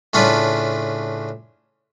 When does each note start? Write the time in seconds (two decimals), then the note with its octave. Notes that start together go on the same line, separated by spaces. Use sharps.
0.13 A2 C#3 D4 F4 B4